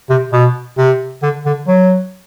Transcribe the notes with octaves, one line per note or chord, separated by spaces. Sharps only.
C3
B2
C3
D3
D3
F#3